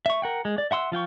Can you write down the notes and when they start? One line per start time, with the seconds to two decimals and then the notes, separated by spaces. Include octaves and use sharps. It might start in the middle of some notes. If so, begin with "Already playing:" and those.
0.06 E5 C#6
0.22 A#4 F#5 G5
0.45 G#3
0.58 D5
0.71 E5 F#5 C6 E6
0.92 F3 F4 G5 C#6